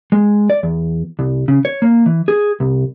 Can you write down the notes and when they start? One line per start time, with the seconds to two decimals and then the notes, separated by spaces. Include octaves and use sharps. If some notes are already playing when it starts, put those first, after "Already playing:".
0.12 G#3
0.50 D5
0.63 E2
1.19 C2
1.48 C#3
1.65 C#5
1.82 A#3
2.06 E3
2.28 G#4
2.60 C2